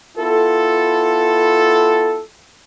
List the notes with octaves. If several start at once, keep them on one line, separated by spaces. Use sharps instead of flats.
B3 E4 F4 A4